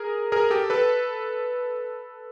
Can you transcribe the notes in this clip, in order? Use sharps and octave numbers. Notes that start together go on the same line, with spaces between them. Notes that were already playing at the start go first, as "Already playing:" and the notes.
Already playing: G#4 A#4
G#4 A#4
G4 A4
A4 B4